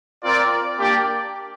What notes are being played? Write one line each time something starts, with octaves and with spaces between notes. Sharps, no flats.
C4 F4 A#4 D5
A#3 D4 G4 D5 G5